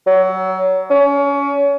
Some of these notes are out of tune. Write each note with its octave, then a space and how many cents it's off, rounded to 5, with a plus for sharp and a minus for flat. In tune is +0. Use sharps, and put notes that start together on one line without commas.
F#3 +25
C#4 +25